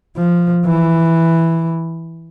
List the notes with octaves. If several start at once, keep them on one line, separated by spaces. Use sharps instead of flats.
F3
E3